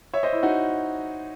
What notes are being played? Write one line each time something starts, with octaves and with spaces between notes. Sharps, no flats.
C#5 E5
C5 D#5
E4
D#4 F#4